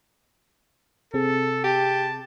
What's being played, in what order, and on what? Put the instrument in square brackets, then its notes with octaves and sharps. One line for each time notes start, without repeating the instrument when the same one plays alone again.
[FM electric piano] C3 C4 G#4 [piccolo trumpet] A4
[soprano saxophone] G4 [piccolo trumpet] A5